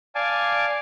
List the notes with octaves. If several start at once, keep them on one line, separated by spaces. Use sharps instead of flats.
D5 F5 G#5 A5 D6